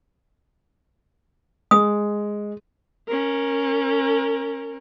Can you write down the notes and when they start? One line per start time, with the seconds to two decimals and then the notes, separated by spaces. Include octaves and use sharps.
1.71 G#3 D#6
3.07 C#4 A#4